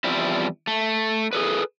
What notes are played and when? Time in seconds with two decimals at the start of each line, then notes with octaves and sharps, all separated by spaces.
0.04 E2 F3 G3 C4 E4
0.67 A3
1.33 G#4 A4 B4